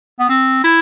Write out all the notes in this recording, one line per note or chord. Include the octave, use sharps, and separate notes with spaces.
B3
C4
E4